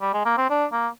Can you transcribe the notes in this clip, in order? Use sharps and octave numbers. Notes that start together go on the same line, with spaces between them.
G3
G#3
A#3
C4
D4
A#3